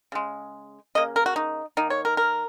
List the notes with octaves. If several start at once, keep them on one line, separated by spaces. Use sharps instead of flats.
C#3 G#3
C#3 A#3 D#5
A#4
F#4
D#4
D#3 A#3 D#4
C#5
A#4
A#4